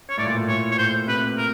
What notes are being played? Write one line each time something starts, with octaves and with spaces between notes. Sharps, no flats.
C#5
A2 D5
A#2
A2
A2 C#5
C#5
A2 C5
C3 B4
A#4